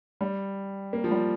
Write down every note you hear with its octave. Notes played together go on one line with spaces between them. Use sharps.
G3
A#3
F3
G3